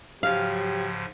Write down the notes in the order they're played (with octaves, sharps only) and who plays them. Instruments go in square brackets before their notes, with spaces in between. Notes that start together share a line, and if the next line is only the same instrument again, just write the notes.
[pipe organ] G#2 C#3 F3 [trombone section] F#3 G4 [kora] F5